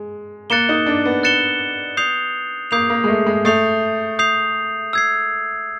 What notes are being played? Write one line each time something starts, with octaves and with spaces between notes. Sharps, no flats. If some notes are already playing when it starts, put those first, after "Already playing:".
Already playing: G#3
A#3 F#6 A6 C#7 E7 G7
D#4
D4
B3
F#6 A6 C#7 E7 G7
D#6 G6 C7 F7
A#3 D#6 G6 C7 F7
A#3
G#3
A3
G#3
A3 D#6 G6 C7 F7
D#6 G6 C7 F7
E6 G#6 C7